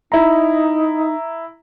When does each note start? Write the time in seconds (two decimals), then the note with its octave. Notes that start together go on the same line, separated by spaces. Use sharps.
0.12 D#4 E4 A#5